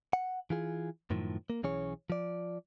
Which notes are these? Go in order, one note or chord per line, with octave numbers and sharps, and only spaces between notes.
F#5
E3 F4 G#4
F#2 A2 D#3 F3
A#3
B1 E3 C#4 G#4 C#5
F3 D5